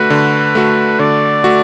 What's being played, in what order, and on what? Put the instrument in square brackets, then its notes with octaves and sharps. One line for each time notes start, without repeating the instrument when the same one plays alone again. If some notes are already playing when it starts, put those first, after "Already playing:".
Already playing: [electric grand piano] D3 A3 F#4 [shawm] B4
[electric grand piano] D3
A3 F#4
[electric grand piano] D3 [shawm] D5
[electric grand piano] A3 F#4